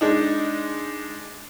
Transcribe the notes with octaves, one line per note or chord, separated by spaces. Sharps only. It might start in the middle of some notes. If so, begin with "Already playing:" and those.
G#3 D4 D#4